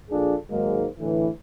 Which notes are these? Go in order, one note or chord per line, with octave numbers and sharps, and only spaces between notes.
A#1 D4 F4 G#4 A4
G#2 D#3 F#3 G#3 A#3
A2 D3 E3